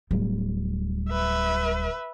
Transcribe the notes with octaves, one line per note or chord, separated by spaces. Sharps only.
D1 G3
B4 E5